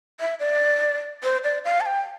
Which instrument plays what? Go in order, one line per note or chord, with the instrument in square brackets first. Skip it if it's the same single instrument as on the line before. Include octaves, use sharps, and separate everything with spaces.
[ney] E5
D5
C5
D5
F5
A5
G5